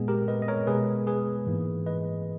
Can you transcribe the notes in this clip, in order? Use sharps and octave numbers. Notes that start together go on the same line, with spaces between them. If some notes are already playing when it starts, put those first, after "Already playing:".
Already playing: A#2 G#3 B3 G#4
G4 A#4
B4 D#5
D#5
A#4 C#5
B2 G#3 B3 G#4 B4
G#4 B4
G#2 E3 A#3
B4 D#5